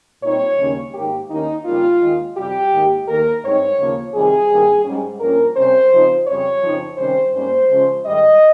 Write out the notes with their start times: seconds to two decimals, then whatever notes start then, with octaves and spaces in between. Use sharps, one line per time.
0.23 A#2 G3 C4 D#4 C#5
0.59 D#2 C#3 G3 A#3 C#4
0.94 G#2 D#3 A#3 G4
1.30 D#2 D#3 A#3 C#4 D#4
1.65 F2 C#3 G3 A#3 D#4 F4
2.01 D#2 D#3 G#3
2.37 F2 C3 G3 G4
2.72 G#2 D#3 A#3 D#4
3.08 D#2 D#3 A#3 D#4 A#4
3.43 G#2 G3 C4 D#4 C#5
3.78 D#2 C#3 F3 A#3
4.14 F2 C3 D#3 G3 G#4
4.49 G2 D#3 G3 A#3
4.85 G#2 G3 C#4
5.20 G2 F3 A#3 C#4 A#4
5.56 C3 G3 C#4 C5
5.91 C#3 F3 C4 D#4
6.27 F2 C#3 G3 C#5
6.63 F2 C#3 F3 C4 D#4
6.98 C3 D#3 G3 C#4 C5
7.33 G#2 G3 A#3 C#4 C5
7.69 C#3 F3 G#3 C#4
8.05 G#2 D#3 G3 D#5